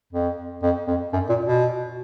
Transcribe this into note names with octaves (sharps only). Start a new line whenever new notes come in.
F2
F2
F2
F#2
A#2
B2